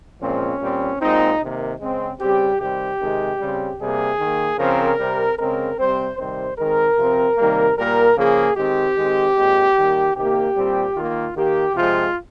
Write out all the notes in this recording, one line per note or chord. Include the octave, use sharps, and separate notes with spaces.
A#2 F3 G#3 C4 C#4
A#2 G3 C4
A#2 G#3 C4 D#4
C3 D#3 A#3
C#3 G#3 C4
C#3 G3 C4 G4
C3 D#3 G3 C4 G4
C3 D#3 G#3 C4
C#3 G3 C4
C3 G3 A#3 G#4
D#3 A#3
C#3 F3 C4 A#4
C3 G3 C4
C#3 G#3 C4 A#4
C3 G3 C4 C5
C3 D#3 G3 C4 C5
D#3 G#3 C4 A#4
C3 F3 C4
C3 D#3 G3 A#3
A#2 G3 A#3 A#4
C#3 F3 A#3 G#4
D#3 G#3 C4 G4
D#3 G#3 C4
A#2 G#3 C4
D#3 G3 A#3
C3 D#3 A#3 G4
A#2 G3 C4
D#3 A#3 F4
D#3 A#3 G4
C3 F3 G#3 C4 F4